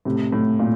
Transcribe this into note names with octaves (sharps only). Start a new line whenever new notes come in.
A2 C3
A2
A#2